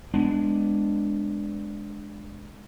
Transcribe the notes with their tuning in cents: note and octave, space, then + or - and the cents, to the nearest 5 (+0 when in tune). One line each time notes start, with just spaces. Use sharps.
G#3 +0 B3 +25 D4 +0